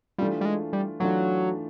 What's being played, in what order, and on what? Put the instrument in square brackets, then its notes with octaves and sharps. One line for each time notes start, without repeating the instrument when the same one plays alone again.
[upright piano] E3 A3 D4 F4 [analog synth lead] G3
[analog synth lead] G3
G#3
G3
[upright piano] E3 A3 D4 F4 [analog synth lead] F#3